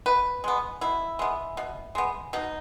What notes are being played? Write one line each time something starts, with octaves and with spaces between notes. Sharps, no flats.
B2 B4
G#3 B3
B2 E4
G#3 B3
B2
G#3 B3
B2 D#4